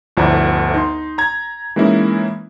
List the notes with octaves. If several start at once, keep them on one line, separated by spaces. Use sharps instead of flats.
G1 D2 F3 D4 E4 A#5
D#4 C6
A#5 G#6
E3 G#3 A#3 C#4 D#4 E4